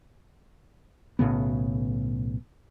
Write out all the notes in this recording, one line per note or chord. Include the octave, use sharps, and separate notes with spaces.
B1 A2 C#3 B3